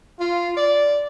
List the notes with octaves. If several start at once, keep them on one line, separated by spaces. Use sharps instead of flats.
F4
D5